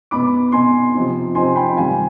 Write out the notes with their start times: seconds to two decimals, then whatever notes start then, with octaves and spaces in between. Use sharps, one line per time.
0.11 B2 B3 D#4 B5 D6
0.52 B2 B3 D#4 G#5 C6
0.94 C3 F3 C4 D#4
1.35 C3 F3 C4 D#4 G#5 C6
1.56 G5 B5
1.77 C3 D#3 G3 F5 G#5